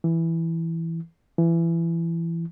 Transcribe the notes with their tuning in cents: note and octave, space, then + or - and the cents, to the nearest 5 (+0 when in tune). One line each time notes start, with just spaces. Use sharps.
E3 +5
E3 +25